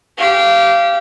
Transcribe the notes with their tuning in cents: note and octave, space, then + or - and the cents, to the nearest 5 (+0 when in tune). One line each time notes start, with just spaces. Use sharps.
G4 -20 F5 -25